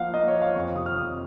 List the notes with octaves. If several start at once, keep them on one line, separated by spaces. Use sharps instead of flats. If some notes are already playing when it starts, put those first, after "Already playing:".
Already playing: F3 A#3 F5 F#5
A#3 D#5
C#5
F3
F5
F2 C#6
C3 D#6
F6
F2 D#6